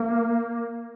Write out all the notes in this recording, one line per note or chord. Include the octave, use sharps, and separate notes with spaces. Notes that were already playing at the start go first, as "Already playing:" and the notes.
Already playing: A#3